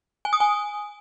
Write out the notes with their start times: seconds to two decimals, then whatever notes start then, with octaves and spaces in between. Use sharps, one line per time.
0.25 G#5
0.33 D#6
0.40 G#5